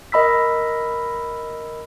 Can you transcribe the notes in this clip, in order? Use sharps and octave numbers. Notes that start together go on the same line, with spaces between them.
A#4 D#5 B5 E6 B6